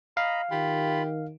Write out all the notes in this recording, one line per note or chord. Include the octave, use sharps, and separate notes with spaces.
D#5 F5 A#5 B5
D#3 F4 G4 B5